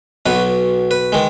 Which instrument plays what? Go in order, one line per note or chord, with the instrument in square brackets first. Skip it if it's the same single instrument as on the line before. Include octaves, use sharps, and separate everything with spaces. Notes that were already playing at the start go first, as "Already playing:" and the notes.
[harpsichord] B1 B2 F#3 B4
B4
D#3 G#3